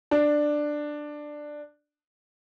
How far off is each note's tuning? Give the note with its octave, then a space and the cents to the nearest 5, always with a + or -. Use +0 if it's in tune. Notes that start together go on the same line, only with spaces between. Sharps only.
D4 +10